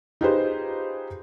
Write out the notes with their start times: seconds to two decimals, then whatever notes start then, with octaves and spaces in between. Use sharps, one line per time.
0.21 D#4 F4 G4 G#4 B4 C5